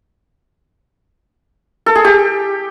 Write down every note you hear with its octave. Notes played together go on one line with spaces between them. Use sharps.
A4
G#4
G4